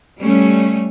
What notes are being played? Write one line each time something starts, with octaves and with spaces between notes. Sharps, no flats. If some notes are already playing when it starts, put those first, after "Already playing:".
G3 A3 C#4